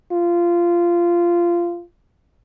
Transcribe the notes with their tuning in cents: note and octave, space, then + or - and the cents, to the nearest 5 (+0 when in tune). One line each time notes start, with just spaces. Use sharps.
F4 -15